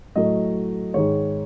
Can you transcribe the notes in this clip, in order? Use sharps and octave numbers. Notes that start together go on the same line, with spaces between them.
A2 F#3 A3 D#5
G#2 D#3 G#3 C#5